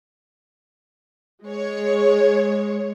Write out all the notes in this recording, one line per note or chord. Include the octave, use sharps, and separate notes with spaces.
G#3 C#5